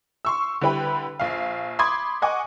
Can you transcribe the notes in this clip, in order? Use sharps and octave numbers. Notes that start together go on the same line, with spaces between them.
C6 C#6 E6
D3 G3 E4 B4 G5 B5
A#1 F5
B5 C6 D6 D#6 G#6
D#5 F#5 G#5 C#6 D6